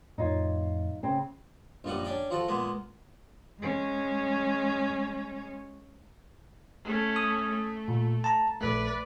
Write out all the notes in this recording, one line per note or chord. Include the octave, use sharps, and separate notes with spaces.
F2 A2 D#4 F4 C#5
C#3 C4
A#1 F#2 G3 D#4 F#5
C#4 D4 G5
F3 F#4 A4
A#2 G#3 A#3 B3
G#3 C#4
A3 C#4
D#6
A3
A#2
A5 A#5
A#1 A3 B4 D5